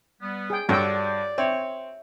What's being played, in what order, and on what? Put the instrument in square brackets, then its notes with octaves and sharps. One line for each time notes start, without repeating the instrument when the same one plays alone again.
[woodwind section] G3 B3
[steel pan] G#4 G5
[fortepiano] G2 [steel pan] F#4 A4 G5 [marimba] C#5 [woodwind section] D5
[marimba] G6
[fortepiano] C4 [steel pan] C#5 [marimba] E5